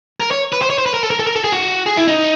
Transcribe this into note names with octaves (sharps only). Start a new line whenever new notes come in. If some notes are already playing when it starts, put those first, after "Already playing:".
A#4
C#5
B4
C5
C#5
C5
B4
A#4
A4
A#4
A4
A#4
A4
G#4
F#4
G#4
E4
D#4